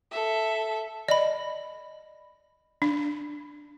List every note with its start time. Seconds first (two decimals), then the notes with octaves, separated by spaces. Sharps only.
0.11 A4 E5
1.08 D5 D#5 B5
2.82 D4